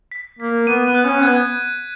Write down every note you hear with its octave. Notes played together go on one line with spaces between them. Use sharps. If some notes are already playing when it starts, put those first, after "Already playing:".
B6
A#3 B6
B3 D#7
B3
F#6
C#4
B3 G#6